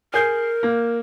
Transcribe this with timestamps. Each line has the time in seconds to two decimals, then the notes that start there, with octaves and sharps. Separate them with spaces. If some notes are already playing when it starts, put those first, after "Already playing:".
0.14 G#4 A#4 G6
0.63 A#3